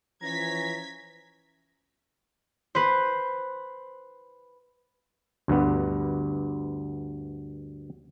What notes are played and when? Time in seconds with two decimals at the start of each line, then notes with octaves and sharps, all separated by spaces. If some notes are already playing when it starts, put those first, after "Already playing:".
0.22 E3 F3 C#4 A#5 G#6 B6
2.75 B4 C5
5.48 D2 G2 B3